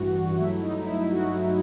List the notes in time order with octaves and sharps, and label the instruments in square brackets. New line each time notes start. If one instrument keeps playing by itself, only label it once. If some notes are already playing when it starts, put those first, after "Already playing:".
Already playing: [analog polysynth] A1 G2 E3 F#4
G2 F#3 A3 E4
D#4
E4
F#4